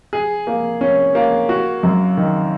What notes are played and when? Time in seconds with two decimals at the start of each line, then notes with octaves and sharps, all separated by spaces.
0.13 G#4
0.47 A#3
0.81 C#4
1.15 A#3
1.49 F#4
1.83 F#2
2.17 D#3